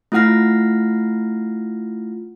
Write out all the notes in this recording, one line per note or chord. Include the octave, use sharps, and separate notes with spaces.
A3 E4 F4 F#5 F6 A#6